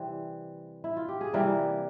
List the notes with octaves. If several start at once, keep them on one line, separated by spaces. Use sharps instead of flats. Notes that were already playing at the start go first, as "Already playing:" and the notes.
Already playing: C3 E3 G3 C4
E4
F4
G4
G#4
C3 E3 G3 A#3 A#4